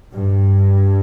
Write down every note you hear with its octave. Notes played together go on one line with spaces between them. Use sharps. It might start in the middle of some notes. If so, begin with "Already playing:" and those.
G2